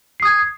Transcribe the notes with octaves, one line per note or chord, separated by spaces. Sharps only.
D#6 G#6 C7